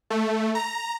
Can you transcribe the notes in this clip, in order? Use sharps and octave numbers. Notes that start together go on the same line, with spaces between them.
A3
A#5